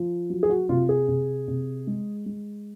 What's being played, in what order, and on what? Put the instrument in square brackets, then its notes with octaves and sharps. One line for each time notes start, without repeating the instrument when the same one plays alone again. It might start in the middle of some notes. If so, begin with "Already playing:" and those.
Already playing: [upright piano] F3
F#3
G#4
F#4
C3 F4
G#4
C3
C3
G#3
G#3